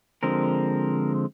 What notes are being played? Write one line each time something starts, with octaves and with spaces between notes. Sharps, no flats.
D3 F3 G#3 C4 A#4